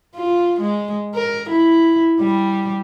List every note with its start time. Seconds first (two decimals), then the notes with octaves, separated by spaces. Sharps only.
0.15 F4
0.60 G#3
1.15 A#4
1.50 E4
2.19 G3